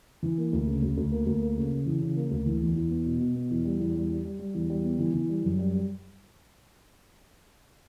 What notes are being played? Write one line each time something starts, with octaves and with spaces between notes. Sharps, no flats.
E3
A#3
D2
C#3
D2
D2
A#3
D2
A#3
C#3
C#3
E3
C#3
A#3
D2
E3
E2
E2
B3
B2
B2
B3
E2
G3
E2
G3
G3
G3
G3
E2
G3
B3
E3
E3
G3
F#2
G3
G3